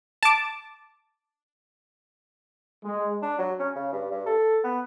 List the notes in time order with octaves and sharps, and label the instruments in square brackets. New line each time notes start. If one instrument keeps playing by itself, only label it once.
[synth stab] A5 D6
[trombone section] G#3
[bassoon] D4
F#3
C#4
C#3
G2
G2
A4
B3